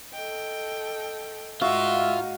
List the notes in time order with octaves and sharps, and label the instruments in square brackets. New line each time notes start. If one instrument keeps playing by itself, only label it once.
[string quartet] A4 D#5 G5
[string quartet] G#2 D#4 [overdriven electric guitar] F4 [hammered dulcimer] F#4 F5 [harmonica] E5